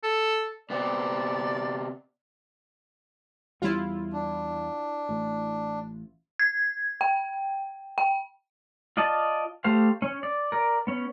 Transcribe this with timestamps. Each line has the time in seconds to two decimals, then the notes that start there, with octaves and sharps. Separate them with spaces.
0.03 A4
0.70 C3 B3 C4 D5
3.62 E2 G3 C#4 E4 F4
4.13 D4
5.09 A1
6.40 G#6
7.01 G5
7.98 G5
8.97 F4 D5 D#5 A5
9.64 A3 G4 C5 F5
10.02 C#4
10.23 D5
10.52 A#4 D5
10.87 B3 C#4